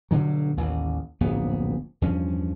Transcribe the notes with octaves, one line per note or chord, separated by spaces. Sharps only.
G2 B2 D3 F#3
A1 D#2 E3
D1 A#1 F#2 B3
E2 G2 F3 C#4